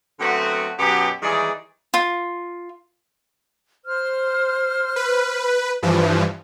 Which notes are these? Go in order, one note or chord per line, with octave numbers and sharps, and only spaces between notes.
D3 F#3 A3 B3 C4 F#4
F#2 B2 F#3 B3 G4
D#3 E3 G3 G#3 G#4 D5
F4
C5 F6
B4
G2 E3 F3